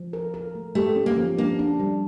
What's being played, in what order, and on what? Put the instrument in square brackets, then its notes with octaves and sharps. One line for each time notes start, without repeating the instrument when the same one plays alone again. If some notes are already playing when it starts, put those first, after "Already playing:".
Already playing: [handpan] F3
A#4
A#4
A3
[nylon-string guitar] A3 [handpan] G4
[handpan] C#4
[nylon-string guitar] A#3
[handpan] F3
[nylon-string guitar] A#3 [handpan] D4
[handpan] D4
G3